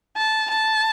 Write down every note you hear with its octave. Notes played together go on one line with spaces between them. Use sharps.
A5
A5